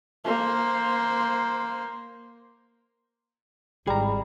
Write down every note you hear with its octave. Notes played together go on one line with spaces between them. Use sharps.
A#3 C5
G#1 G3 G#4 A#5